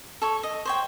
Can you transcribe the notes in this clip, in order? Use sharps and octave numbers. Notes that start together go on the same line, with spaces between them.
A4 C#5
D#5
C5 C#5 G5